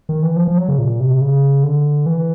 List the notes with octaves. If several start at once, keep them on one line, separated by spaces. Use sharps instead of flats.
D#3
E3
F3
F3
F#3
C#3
A#2
C3
C#3
D3
E3